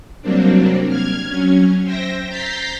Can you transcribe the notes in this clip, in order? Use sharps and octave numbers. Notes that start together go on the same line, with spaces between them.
C3 F#3 G3 A#3 C4 D4
F6 G#6
F#3 C#4
C5 E5 G5 A#6
A#5 G6 A6 B6 C7